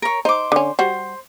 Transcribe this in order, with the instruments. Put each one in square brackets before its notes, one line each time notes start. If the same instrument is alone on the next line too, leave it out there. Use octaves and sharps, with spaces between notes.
[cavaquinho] A#4 C#5
[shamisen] D#4 [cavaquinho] C5 D6
[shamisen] D3 C#4
[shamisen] G3 F#4 [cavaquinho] C5